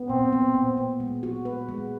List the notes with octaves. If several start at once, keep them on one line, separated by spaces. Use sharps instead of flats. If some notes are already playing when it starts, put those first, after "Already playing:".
Already playing: B3
A#2 C4
B3
A#2
B3
G#3
F#4
B4
G#3